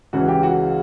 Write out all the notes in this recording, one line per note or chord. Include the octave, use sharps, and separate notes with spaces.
C#2 C#3 E3 F#4
G4
F#4